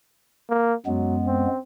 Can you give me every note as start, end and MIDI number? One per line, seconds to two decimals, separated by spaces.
0.50 0.74 58
0.86 1.47 42
0.86 1.16 54
0.86 1.47 56
0.86 1.47 59
1.26 1.59 60